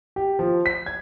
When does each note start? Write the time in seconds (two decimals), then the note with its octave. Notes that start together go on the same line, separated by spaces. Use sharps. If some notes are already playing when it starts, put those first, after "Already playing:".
0.16 G4
0.39 F3
0.66 B6
0.86 G#6